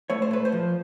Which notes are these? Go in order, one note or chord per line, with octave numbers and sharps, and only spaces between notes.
A3 C#5
C5
A3 B4
C5
F3